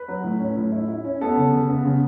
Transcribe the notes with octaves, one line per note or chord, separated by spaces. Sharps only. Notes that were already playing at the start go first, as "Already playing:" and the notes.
Already playing: B4
F#3
A2
C#4
A2
E4
E4
C#4
B3 A4
C#3
C#3
B3
C#3